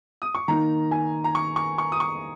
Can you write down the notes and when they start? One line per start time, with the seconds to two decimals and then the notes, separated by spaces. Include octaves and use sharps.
0.22 D#6
0.35 C#6
0.48 D#3 A#3 D#4 A#5
0.91 G#5
1.24 A#5
1.35 C#6
1.56 C#6
1.78 C#6
1.92 D#6
2.00 C#6